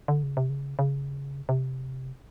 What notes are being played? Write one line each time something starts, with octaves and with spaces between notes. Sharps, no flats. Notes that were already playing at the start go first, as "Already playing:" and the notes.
D3
C#3
C3
C#3
C#3
C3